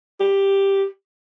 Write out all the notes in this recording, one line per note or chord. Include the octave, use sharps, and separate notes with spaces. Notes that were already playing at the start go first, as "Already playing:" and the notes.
G4